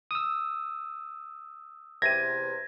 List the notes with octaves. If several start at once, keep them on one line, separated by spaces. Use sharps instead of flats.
D#6 E6
E2 C3 G#6 A#6 D#7